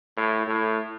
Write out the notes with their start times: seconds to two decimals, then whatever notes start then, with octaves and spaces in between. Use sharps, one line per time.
0.17 A2
0.47 A2